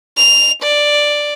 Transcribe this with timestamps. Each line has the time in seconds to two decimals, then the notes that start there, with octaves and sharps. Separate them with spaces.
0.17 F7
0.63 D5